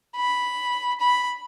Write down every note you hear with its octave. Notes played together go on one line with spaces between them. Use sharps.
B5
B5